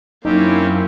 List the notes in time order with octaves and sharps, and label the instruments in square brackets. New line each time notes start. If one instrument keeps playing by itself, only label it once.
[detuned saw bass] F#2 [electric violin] A#3 E4 [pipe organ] C4 C#4 G4 [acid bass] D#4